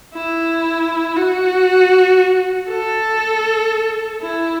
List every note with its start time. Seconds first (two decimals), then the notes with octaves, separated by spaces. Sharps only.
0.14 E4
1.16 F#4
2.69 A4
4.22 E4